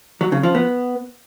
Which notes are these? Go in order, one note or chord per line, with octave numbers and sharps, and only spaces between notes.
F#3
C#3
F3
B3